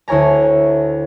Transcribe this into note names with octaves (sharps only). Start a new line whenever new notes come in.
D2 E4 C#5 G#5 A#5